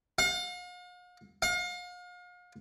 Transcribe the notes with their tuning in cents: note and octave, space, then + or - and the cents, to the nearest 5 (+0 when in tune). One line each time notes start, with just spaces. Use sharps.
F5 +45
F5 +40